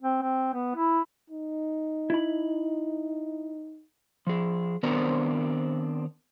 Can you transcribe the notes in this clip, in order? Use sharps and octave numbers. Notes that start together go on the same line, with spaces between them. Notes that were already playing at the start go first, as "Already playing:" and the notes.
C4
C4
B3
E4
D#4
E4 B5
F3 G#4
D#3 B3 C4 D4 A#4 C5